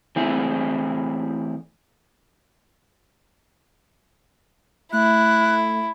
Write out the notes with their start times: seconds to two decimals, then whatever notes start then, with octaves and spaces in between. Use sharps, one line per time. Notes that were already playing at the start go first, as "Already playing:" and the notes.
0.16 E3 A3 C4 E4 G#4
4.93 A3 E4 F#6